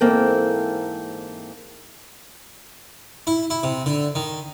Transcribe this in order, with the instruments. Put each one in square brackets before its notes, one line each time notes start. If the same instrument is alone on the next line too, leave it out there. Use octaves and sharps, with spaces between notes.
[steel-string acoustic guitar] G#2 E3 A#3 C4 A4 G5
[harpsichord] E4
E4
C3
D3
D#3